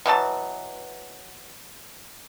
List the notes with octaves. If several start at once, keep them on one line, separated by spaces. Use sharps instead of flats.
B2 E3 F#3 A5